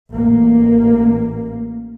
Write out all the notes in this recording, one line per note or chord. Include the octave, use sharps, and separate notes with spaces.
A1 A#3